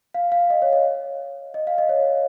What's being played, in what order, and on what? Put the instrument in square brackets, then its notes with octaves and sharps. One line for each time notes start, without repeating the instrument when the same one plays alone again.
[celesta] F5
F5
D#5
C#5
D#5
D#5
F5
D#5
C#5